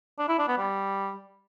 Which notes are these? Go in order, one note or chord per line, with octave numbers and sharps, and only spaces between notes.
D4
E4
D4
B3
G3